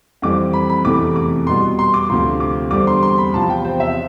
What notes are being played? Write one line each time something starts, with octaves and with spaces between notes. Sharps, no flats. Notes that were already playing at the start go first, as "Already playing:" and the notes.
F2 E3 G3 C4 D6
B5
B5
F1 E2 C3 E3 A3 D6
D6
E2 B2 G3 B3 C6
C6
D6
D2 C3 F3 C6
D6
E2 D3 G3 C4 D6
C6
C6
B5
E2 C3 F3 A5
G5
C5
E5